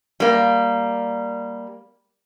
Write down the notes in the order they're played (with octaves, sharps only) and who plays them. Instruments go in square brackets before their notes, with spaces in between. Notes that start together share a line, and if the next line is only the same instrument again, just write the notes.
[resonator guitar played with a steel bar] G3 A#3